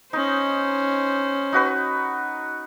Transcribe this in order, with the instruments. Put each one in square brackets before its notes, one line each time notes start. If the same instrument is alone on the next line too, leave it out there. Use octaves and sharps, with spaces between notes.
[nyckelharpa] C#4 C5 [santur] D#4
[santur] D#4 F#4 B4